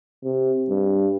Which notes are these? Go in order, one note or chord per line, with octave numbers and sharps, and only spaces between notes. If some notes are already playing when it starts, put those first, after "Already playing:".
C3
G2